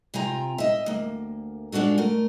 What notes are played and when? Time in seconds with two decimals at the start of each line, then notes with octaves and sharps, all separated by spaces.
0.14 C3 F4 G5 G#5 A#5
0.58 D#5 E5
0.86 D2 A#3
1.72 G#3 D4 F4 F#4 A4
1.98 A3 A#4